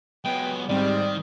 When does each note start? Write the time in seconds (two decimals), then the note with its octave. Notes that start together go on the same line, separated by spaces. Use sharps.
0.25 F#3 G#3 B3 G5
0.69 G#2 D#3 G3 C4 D5